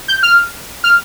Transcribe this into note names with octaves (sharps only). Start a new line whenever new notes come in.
G6
F6
F6